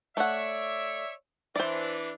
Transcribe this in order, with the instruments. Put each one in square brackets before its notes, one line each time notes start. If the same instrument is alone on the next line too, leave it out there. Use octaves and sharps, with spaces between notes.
[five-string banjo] A3 F#5 [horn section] C#5 D5 E5
[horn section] E3 D4 [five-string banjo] C5 D5